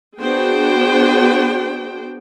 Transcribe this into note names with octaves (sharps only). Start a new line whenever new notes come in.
B3 D4 F#4 G#4 C5 G5